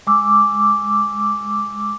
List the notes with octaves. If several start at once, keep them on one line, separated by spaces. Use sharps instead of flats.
G#3 D6 E6